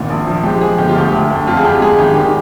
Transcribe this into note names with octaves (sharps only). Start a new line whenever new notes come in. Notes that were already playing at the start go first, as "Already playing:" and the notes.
Already playing: G#1 A#2
A#1
F3
G#3 G4
F3 G#4
G1 G4
F4
D2 G4
D2
D2
F2 F4
G#4
F2 G4
G#3 G#4
G#1 G4
D#3 G4